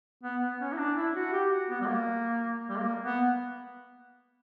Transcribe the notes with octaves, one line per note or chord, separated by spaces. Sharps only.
B3
B3
C#4
E4
D4
E4
F#4
G4
F#4
B3
G3
A#3
G3
A#3
B3